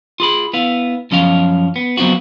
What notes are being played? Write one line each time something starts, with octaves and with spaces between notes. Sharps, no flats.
F4 G#4 B5
B3 E4 F5
F#2 F3 C#4 F5
B3
F#3 B3 C4 F4 F#4